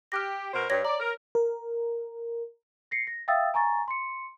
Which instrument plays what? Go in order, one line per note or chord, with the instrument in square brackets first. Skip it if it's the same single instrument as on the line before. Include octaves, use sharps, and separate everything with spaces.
[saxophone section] G4 [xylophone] F6 F#6 A#6
[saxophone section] B2 A#4 C5
[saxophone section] G2 [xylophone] C#5 G#6 A#6
[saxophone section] D5 [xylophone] A#5
[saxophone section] A#4
[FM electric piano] A#4
[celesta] A#6 C7 C#7
A#6
E5 F5 G5 D#6 E6 A6
G#5 A#5 C#6 A6
C6 C#7